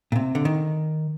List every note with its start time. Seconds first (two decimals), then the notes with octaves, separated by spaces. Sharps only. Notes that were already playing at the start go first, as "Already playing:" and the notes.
0.12 A#2
0.16 C3
0.35 D3
0.45 D#3